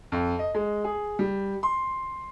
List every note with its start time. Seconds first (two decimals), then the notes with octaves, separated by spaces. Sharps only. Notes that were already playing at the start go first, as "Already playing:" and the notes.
0.12 F2
0.39 D#5
0.55 G#3
0.84 G#4
1.19 G3
1.63 C6